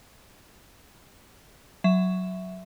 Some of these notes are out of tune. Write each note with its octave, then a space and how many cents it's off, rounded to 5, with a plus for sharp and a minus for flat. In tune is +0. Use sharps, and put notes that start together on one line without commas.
F#3 +0 E5 +0